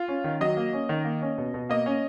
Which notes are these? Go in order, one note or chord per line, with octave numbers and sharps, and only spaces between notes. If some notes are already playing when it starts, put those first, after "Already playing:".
Already playing: F4
C#4
D#3
F#3 D#5
A#3
C#4
D#3
A#3
C#4
B2
B2
A#3 D#5
C#4